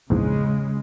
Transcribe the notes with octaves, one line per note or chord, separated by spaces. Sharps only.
A#1 E2 G#2 C#3 G#3